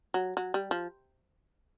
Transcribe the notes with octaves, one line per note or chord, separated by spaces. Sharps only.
F#3
F#3
G3
F3